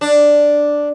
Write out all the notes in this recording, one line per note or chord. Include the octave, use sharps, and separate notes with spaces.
D4